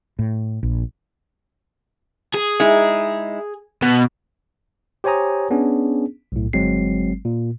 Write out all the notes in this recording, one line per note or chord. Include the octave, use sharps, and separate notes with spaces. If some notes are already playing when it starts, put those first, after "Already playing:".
A2
A#1
G#4
G#3 D#4 E4
B2 B3
G4 C5 C#5 G#5 A#5 D#6
B3 C#4 D4 G#4
B1 A2
G1 F#3 G#3 C4 C7
A#2